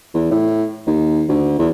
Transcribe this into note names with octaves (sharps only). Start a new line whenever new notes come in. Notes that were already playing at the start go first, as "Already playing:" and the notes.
E2
A2
D#2
D2
E2